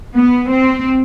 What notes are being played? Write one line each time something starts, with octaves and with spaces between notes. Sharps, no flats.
B3
C4